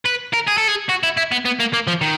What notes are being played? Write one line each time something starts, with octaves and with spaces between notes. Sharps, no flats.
B4
A#4
G#4
A4
G#4
F#4
E4
E4
B3
B3
A#3
A#3
F3
D#3